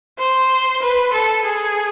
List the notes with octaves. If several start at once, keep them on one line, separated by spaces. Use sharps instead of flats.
C5
B4
A4
G#4